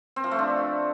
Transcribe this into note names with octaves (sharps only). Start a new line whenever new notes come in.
C4
F3
A3
D4